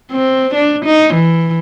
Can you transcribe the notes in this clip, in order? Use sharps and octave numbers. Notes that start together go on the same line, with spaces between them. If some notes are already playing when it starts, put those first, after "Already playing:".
C4
D4
D#4
E3